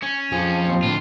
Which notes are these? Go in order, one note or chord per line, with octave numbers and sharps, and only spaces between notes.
C#4
F2 F3 G#4
D#2 C4
A2 D3 F4